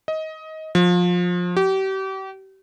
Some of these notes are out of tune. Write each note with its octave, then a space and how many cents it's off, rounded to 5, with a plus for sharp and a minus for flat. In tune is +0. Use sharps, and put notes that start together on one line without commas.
D#5 +20
F3 +25
G4 -35